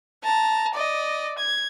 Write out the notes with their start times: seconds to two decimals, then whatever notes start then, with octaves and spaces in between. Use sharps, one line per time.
0.24 A5 A#5
0.74 D5 D#5
1.39 G#6